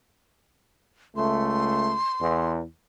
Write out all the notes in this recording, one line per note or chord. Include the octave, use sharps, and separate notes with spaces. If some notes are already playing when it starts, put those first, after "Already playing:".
C#2 A3 C6
E2